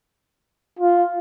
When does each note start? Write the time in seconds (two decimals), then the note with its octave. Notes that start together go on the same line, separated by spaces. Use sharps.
0.79 F4